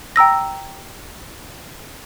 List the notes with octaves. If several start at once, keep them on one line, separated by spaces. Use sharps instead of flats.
G5 A#5 E6 A#6